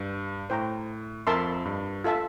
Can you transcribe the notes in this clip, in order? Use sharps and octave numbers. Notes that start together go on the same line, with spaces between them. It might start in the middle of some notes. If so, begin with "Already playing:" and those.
Already playing: G2
A2 C5 G5 A#5
F2 A#4 E5 A5 C6
G2
F4 A4 E5 A5